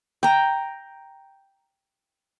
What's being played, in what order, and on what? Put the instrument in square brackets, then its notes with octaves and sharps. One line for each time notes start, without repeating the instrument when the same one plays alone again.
[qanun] G5 A#5